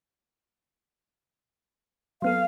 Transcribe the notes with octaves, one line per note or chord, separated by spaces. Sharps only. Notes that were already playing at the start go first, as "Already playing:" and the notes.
F#3 B3 A4 F5